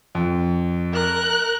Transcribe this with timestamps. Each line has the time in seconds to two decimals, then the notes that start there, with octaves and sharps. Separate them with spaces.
0.15 F2
0.93 A#4 F#6